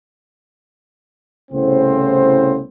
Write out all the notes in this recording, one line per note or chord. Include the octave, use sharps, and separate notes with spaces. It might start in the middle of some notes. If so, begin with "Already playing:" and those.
C2 A2 C#3 B3 C4 C5